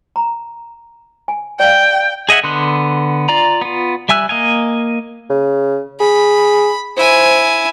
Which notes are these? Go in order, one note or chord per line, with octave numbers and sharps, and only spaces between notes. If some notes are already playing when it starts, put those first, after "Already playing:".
A#5
G#5
D5 F5 G5
G#4 D#5 E5 F#5 G#5
D3 B3 C6 F#6
F4 D5 A#5
B3 F4
G3 E5 G#5 E6 F#6
A#3 D#5 F5 G#5
C#3
G#4 B5
E4 C5 G#5